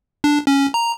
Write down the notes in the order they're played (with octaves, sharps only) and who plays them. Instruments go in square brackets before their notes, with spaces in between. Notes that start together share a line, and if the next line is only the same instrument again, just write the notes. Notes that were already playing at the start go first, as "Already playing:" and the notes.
[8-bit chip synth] D4
C#4
A#5